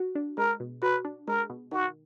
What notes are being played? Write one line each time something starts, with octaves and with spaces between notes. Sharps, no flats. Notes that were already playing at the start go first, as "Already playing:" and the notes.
Already playing: F#4
D4
G#3 A#4
B2
F#4 B4
D4
G#3 A#4
B2
D#3 F#4